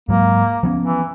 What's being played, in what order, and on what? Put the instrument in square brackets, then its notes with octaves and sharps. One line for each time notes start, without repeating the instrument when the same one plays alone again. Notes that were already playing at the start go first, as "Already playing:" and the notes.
[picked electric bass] G#2 F#3 G#3 [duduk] A#3
[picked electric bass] F3 B3 C#4
[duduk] E3